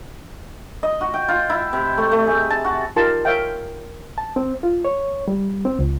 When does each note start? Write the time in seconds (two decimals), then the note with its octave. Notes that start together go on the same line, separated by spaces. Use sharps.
0.83 D#5
1.01 F#4
1.14 G5
1.28 F4
1.50 E4
1.73 C3
1.98 A3
2.12 A3
2.27 G#4
2.50 A5
2.64 F#4
2.96 D#4 F4 G4 A#4 A5 C6
3.25 A#4 C#5 E5 F5 G5
4.18 A5
4.36 C4
4.63 F4
4.85 C#5
5.28 G3
5.65 C4
5.79 C#2